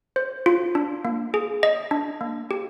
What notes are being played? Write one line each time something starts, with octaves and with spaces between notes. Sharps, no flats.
C5
F4
D4
A#3
G#4
D#5
D4
A#3
G4